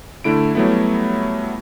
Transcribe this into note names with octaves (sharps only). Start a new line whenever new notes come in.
D3 A3 E4 D7
F#3 G3 A3 B3 E4